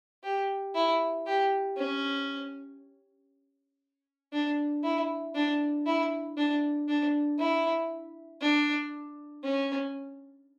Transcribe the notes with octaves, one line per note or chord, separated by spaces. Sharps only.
G4
E4
G4
C#4
D4
E4
D4
E4
D4
D4
E4
D4
C#4